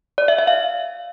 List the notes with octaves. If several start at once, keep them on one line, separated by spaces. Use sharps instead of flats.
D5
E5
E5
F5